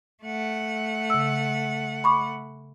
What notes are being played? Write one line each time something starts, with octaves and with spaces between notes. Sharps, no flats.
A3 F#5
C#3 E6
B5 C#6 D6